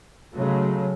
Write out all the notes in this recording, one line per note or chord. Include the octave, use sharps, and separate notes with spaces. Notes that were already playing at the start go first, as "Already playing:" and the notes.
C#3 F#3 G#3 A3